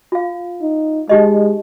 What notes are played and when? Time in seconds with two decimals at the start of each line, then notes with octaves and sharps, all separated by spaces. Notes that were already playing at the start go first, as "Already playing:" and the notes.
0.12 F4 F5
0.62 D#4
1.09 G#3 D#4 G4 D#5